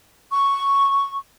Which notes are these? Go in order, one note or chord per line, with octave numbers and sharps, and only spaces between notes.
C#6